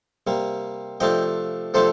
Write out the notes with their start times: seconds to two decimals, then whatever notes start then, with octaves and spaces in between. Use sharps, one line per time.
0.27 C3 G3 A#3
1.00 C3 F3 A3 D4 D#5 G5
1.74 C3 F3 A3 D4 A4 C5